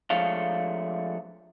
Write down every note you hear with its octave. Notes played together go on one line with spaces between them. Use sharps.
F3 G#3 A3 D4 C#5 F5